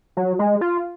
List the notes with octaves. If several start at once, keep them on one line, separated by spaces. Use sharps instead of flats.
F#3
G#3
F4